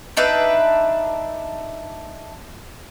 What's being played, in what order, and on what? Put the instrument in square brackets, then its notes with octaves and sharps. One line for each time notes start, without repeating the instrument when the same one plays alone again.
[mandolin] D4 D#4 B4 E5